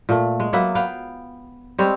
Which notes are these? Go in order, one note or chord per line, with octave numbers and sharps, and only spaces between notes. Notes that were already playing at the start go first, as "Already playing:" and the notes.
A#2 A3
G#3
F#3 A#3 B3 E5
B3 F5 G5
G3 G#3 C4 C#5